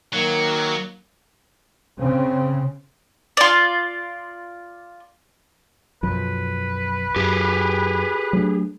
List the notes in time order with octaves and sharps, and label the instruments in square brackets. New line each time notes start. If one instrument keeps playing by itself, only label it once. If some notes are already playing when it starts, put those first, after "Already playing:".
[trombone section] D#3 A#3 [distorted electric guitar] F#3
[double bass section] C#3 C4
[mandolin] F4 D5
[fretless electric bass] B1 F#2 F3 [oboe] B4
[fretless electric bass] F#2 [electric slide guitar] G4 G#4
[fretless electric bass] F#3 A3 D4